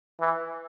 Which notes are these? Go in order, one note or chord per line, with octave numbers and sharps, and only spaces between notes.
E3